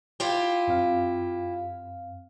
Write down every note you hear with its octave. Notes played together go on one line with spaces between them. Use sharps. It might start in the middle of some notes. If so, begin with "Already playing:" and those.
E4 F4 G4
F#2 C4 F5